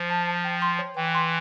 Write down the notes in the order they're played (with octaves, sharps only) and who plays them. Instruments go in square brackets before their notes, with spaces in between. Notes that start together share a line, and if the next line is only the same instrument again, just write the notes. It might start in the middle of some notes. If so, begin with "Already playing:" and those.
Already playing: [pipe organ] F3
[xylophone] A5
A5
G5
C6
C#5
[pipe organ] E3 [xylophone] G5
[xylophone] C6